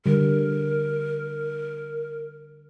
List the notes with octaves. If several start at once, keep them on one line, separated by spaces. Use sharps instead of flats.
D3 G3 A#4